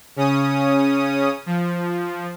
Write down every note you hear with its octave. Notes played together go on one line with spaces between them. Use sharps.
C#3 C#4 D#6
F3